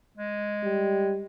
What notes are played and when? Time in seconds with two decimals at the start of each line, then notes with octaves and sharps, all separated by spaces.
0.17 G#3
0.63 G3